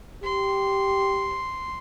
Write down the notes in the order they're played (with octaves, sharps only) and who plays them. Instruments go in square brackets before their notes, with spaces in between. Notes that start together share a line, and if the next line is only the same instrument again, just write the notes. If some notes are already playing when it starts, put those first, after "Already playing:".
[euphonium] G4 [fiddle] C6